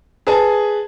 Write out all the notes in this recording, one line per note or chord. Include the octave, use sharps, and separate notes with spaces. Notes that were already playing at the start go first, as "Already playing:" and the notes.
G#4 B4 G#5 A5